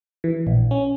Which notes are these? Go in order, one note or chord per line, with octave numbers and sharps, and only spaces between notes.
E3
A#1
C#4